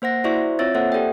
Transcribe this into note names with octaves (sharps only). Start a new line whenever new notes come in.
A#3 C5 F#5 A#6
E4 F#4 C5 D5 E5 C#6
C4 F4 C#5 E5 E6 A6
A#3 A4 C5 E5 F#5
G4 A4 D5 G5